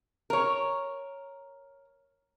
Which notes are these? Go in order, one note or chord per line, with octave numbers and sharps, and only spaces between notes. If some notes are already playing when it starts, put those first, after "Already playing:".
A#4 C#5